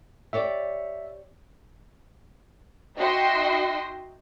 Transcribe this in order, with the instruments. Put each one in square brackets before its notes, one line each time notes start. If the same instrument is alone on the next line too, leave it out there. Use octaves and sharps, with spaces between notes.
[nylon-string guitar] G4 C#5 D5 [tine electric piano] E5
[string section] D#4 F#4 D#5 E5 G5 C6